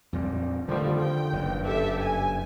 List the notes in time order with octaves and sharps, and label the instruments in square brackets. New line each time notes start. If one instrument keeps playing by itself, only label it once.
[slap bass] F2 A#2 G3
[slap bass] D3 D#3 [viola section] F3 G3 A3
[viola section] G5
[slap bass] F#1 G2
[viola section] G4 A4 E5
G#5